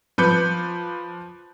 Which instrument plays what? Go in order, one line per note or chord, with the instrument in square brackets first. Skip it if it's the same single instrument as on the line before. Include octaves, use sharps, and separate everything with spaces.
[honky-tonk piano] F3 B4 D6 G6 C#7